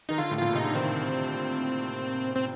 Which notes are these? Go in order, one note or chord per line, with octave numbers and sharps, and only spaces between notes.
D#3 D#4
D3 F4
A2
A#2 F4
C3 D#4
D3
D#3 C4
C4